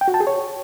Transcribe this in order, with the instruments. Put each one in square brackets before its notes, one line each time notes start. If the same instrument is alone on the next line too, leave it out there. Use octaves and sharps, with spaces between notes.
[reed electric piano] G5
F#4
A5
G#4
C#5